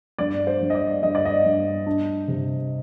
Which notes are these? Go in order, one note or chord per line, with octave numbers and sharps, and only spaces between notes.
G2 D5
C5
G2
D#5
D5
G2 D#5
D5
D#5
G2
D4
C3